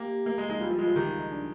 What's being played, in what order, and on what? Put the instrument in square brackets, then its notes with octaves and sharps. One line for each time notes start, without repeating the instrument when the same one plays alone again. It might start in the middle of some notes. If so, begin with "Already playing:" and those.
Already playing: [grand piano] A#3 [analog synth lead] G4
[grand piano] A#3
G#3
[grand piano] G#3 [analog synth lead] D#4
[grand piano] G3 [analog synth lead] F4
[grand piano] F3
[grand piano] G#3 [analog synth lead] F4
[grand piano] F3
[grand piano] D#3 [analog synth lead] G4
[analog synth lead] F4
D#4
D4